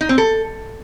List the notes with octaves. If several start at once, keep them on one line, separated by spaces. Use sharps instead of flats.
D#4
C4
A4